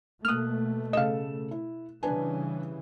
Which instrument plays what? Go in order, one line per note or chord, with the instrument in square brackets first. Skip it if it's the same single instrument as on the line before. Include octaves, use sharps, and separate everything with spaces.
[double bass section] B2 A3 [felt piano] A#3 F#6 [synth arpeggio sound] D#6 F6
[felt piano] C#3 A4 E7 [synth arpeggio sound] D#5 F5
[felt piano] E4
[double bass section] C#3 E3 G3 [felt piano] D4 B4 G#5